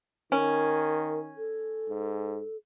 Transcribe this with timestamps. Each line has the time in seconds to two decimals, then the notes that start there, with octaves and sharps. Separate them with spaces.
0.32 D#3 C#4 A#4
1.37 A4
1.89 G#2